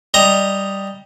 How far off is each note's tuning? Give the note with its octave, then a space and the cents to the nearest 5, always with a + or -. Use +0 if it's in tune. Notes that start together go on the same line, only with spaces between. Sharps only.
G3 +0 D#5 +0 A#5 +0